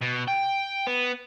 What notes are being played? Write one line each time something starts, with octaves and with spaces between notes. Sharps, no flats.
B2
G5
B3